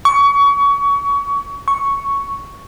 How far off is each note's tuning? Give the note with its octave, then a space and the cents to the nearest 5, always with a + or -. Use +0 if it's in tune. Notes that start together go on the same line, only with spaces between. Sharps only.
C#6 +25
C#6 +0